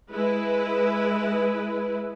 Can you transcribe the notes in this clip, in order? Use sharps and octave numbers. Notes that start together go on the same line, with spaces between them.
G#3 E4 B4